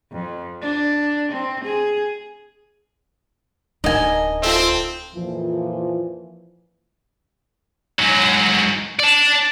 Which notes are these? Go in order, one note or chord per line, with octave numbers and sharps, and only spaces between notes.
F2
D4
C4
G#4
D1 D4 D#4 A#4 D#5 G#5
C4 F4 A4 E5
F2 A#2 E3 F3
G#2 F#3
D5 A5